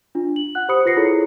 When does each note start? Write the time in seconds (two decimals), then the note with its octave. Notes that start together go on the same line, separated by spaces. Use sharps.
0.15 D4 F4
0.36 F#7
0.55 F#5 F#6
0.69 G4 C5 B5 D#6 C#7
0.85 F4 B4 A#6 C7 C#7
0.97 E4 F4 G#4 A4 C#5